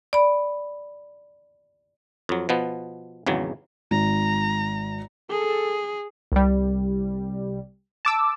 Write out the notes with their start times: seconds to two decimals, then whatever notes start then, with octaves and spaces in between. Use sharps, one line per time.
0.13 D5 B5
2.29 F2 F#3
2.49 B2 F3 B3
3.27 G#1 E2 C#3 F#3
3.91 G#1 A#5
5.30 G#4 A4
6.32 C2 G3
8.05 A5 D6 E6